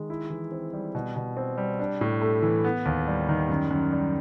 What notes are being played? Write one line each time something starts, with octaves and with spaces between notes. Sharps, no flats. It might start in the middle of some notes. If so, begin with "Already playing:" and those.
Already playing: D#3 G#3
E4
E3
C4
G3
B2
B2
C4
G3
D4
A2
A3
E3
B3
D#2
G3
D#3
F#2
F#2
G3